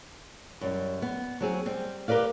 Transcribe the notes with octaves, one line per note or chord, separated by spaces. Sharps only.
F#2 G3
B3
F#3 C4 G#4
G3 C4
G4 A#4 B4 D5 F5